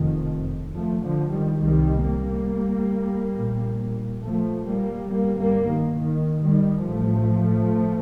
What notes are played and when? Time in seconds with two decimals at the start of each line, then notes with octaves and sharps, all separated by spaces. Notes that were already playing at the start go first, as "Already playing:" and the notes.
Already playing: F1 F2 C3 D#3
0.75 F3 A3
1.04 D3 F3
1.33 D#3 G3
1.62 C2 C3 D#3 G3
2.06 G3 A#3
3.36 A#1 A#2
4.24 F3 A3
4.67 G3 A#3
5.11 G1 G2 G3 A#3
5.40 G3 A#3
5.69 D#3
5.98 D#3
6.41 D#3 G3
6.85 A1 A2 F3 A3